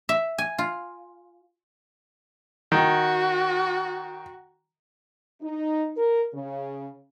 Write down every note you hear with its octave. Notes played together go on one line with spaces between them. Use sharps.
E5
G#5
F4
D#3 F#4
D#4
A#4
C#3